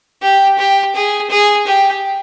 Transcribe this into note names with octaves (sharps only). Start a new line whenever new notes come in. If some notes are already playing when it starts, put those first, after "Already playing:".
G4
G4
G#4
G#4
G4